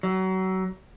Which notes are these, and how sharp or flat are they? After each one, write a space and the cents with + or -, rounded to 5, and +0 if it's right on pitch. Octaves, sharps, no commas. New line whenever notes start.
F#3 +30